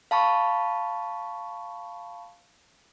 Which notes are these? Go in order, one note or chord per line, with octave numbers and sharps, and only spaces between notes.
F5 A5 B5 C#6